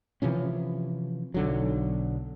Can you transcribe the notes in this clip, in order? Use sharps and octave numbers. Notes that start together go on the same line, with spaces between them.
C3 E3 F3 C#4
B1 D3 F#3